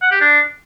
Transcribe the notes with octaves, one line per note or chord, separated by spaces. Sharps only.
F#5
G4
D4